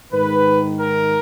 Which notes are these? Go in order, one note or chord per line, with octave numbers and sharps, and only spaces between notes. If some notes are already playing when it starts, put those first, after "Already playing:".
G#2 D#3 B4
A#4